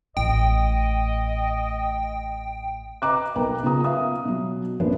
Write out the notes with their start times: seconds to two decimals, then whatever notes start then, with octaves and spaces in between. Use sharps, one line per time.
0.17 A1 A2 D#5 G5
3.02 B4 D#5 A#5 D6 F#6
3.36 B1 A#4 B4 G5 A#5
3.63 C#3 B3 F4 A#5 D#6
3.84 E5 F5 D#6
4.25 B2 F#3
4.80 A1 F#2 F3 A#3 D4 B4